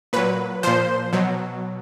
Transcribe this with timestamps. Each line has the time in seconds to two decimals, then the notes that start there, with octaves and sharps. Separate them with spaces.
0.13 A#2 F#3 B4
0.63 A#2 F3 C5
1.13 B2 F#3